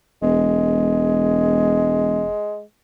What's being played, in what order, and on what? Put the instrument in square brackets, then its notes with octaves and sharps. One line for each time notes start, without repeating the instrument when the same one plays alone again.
[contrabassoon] E1 [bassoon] G#3